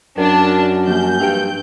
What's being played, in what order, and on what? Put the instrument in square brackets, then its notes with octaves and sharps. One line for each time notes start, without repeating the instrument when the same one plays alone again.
[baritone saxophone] F#2 [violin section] D4 A5 [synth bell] A#4
[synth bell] F3 A#3 G#5 [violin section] G6
[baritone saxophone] G2 [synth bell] G5 D7